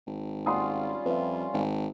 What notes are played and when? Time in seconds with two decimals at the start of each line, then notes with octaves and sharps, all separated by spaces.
0.07 G#1
0.46 G3 C#4 F4 F#5 C6 D#6
1.06 F2 B4 E5
1.54 G#1